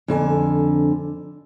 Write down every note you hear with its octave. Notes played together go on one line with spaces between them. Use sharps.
F2 D3 F#4 G#5